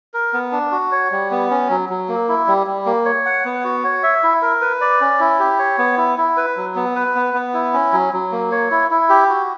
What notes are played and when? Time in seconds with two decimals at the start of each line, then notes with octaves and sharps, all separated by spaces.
0.14 A#4
0.34 B3
0.52 D4
0.72 F#4
0.92 C#5
1.11 G3
1.31 B3
1.51 C#4
1.70 F#3
1.89 F#3
2.09 A#3
2.29 E4
2.47 G3
2.67 G3
2.86 A#3
3.05 C#5
3.26 F#5
3.45 B3
3.64 F#4
3.84 C#5
4.03 E5
4.23 E4
4.42 A#4
4.61 B4
4.81 D5
5.01 C#4
5.20 E4
5.40 G4
5.59 C#5
5.78 B3
5.97 E4
6.18 E4
6.37 B4
6.57 F#3
6.75 B3
6.96 B4
7.15 B3
7.34 B3
7.54 E4
7.74 C#4
7.93 F#3
8.13 F#3
8.32 A#3
8.52 C#5
8.71 E4
8.91 E4
9.09 G4
9.29 F#4